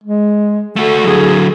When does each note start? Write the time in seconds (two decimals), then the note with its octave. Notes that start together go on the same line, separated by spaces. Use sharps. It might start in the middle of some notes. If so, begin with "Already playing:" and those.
0.04 G#3
0.76 A3 F#4 A4
1.04 D3 F#3 G#4